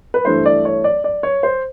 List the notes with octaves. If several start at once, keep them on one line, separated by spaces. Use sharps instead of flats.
B4
G2 E3 A3 C5
D5
C#5
D5
D5
C#5
C5